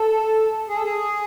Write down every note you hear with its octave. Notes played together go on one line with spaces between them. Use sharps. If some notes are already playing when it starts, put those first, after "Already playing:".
Already playing: A4
G#4
A4
G#4